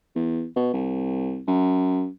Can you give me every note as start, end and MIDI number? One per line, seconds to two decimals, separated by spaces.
0.15 0.46 40
0.56 0.69 47
0.73 1.42 36
1.48 2.08 42